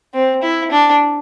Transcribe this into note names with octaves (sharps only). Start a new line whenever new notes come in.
C4
E4
D4